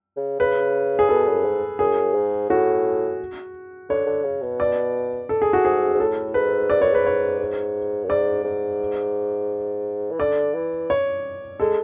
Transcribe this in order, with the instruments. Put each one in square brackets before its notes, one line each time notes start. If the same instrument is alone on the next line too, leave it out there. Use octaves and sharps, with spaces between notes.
[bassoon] C#3
[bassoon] C#3 [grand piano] B4
[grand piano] G#4
[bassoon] B2 [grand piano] A4
[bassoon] F#2
G#2
[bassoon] F#2 [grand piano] G#4
[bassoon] G#2
[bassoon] A2 [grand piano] F#4
[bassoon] D3 [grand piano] C#5
[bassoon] D3
C#3
B2
[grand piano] D5
A4
G#4
F#4
[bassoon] G#2 [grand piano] G#4
[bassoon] G#2
[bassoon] A2 [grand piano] A4
[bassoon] G#2 [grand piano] B4
[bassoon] G#2 [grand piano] D5
[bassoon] F#2 [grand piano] C#5
[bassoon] G#2 [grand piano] B4
[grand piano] C#5
[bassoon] G#2
F#2
[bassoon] G#2 [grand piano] D5
[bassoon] G#2
E3
[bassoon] D3 [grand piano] D5
[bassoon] E3
[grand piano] C#5
[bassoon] G#3 [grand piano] A4